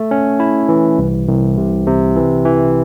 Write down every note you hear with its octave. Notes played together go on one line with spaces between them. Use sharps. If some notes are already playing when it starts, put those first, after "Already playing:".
Already playing: A3
C#4
E4
E3
C2
C2
C3
C3
E3
E3